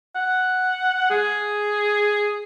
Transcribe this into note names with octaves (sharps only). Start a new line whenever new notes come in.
F#5
G#4